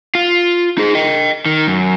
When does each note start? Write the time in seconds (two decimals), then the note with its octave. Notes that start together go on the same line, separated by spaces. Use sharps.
0.15 F4
0.78 D#4 G#4
0.95 D#5 G5
1.46 D#3
1.67 F#2